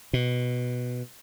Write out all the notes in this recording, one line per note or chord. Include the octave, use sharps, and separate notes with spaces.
B2